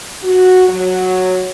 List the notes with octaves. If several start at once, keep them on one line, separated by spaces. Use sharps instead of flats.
F#4
F#3